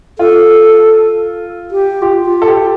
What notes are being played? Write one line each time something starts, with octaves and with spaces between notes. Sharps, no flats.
F4 A4
G4
F4 G4
F4
A4
G4